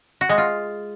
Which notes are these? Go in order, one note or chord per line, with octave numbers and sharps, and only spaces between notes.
F#4
G#3
F4